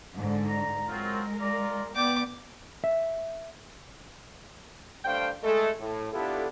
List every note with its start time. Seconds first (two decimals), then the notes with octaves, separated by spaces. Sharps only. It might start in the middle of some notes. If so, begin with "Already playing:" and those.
0.16 G#2 D3
0.46 A#5
0.88 F#3 G#3 C4 F4 A#4
1.39 F4 D5 A#5
1.96 B3 D5 G5 D6
2.84 E5
5.05 G2 A3 D4 C5 F5 G5
5.43 G#3 A3 A4
5.80 A2
6.13 B3 D4 E4 F4 G4 A4